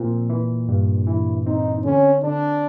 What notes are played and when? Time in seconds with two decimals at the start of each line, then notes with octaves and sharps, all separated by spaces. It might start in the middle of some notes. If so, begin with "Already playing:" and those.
Already playing: A#2 F3 C4
0.30 E3
0.68 G2
1.07 E3 E4
1.46 C4 D#4
1.85 D3 C#4
2.24 D3 D4